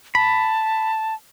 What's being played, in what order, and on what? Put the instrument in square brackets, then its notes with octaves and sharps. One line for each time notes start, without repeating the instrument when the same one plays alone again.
[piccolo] A5 [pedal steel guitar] B5